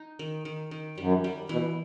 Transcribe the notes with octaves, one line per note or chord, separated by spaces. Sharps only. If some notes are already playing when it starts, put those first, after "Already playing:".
Already playing: D#4
D#3
D#3
D#3
F#2 G3
G3
B2 E3